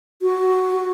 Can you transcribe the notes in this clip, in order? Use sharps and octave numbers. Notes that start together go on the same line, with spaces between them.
F#4